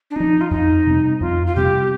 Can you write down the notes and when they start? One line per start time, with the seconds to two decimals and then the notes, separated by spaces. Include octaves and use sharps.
0.11 D4
0.16 F3 C4 D#4
0.41 F4
0.50 F2 D#4
0.86 C3 G3 C4
1.20 F2 F4
1.47 F4
1.55 C3 G3 C4 G4